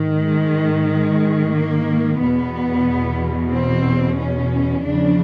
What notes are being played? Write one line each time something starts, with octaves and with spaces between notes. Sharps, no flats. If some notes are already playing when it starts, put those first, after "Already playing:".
Already playing: G#2 D#3
G#3
G#3
A#3
E2 B2 B3
C4
C#4
E2 C#3 F3 D4